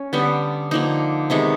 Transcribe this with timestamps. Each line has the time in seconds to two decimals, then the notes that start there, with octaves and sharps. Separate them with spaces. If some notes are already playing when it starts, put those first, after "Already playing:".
Already playing: C#4
0.13 D3 G3 B3
0.71 D3 F3 A#3 D#4
1.30 C3 D#3 G#3 B3